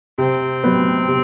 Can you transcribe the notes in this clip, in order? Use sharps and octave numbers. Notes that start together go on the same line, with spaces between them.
C3 C4
F#3 B3
C3